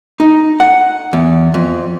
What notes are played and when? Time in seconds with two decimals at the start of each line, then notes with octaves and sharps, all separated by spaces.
0.20 D#4
0.60 F#5
1.13 E2
1.54 F2